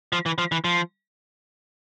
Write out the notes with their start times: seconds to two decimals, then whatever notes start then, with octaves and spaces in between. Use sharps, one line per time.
0.13 F3
0.26 E3
0.38 F3
0.52 E3
0.65 F3